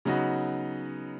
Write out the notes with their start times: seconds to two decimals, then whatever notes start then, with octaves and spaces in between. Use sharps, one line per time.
0.05 C#3 F#3 B3 D#4 F#4